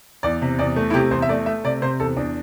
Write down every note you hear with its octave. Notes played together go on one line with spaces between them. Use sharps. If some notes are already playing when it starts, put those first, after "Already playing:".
E2 D5
C3
E2 D5
A3
E4
C3 G4
E2 C5
E5
A3 D5
A3 E5
C3 D5
C3 C5
E2 A4
E2 D4